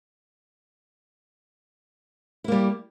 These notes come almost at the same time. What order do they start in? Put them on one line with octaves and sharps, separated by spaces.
E4 A#3 G3